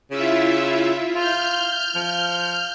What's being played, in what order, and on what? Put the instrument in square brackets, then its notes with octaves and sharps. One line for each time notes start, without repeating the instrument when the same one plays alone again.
[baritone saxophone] C#3 [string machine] E4 F4 E5
[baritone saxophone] F4 [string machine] F6 G6
[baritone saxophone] F3